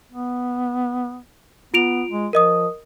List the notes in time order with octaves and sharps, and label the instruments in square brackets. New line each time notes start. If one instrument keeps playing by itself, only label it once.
[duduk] B3
[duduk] B3 [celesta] F4 D7 F7
[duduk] G#3
[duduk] F3 [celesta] A#4 D#5 D#6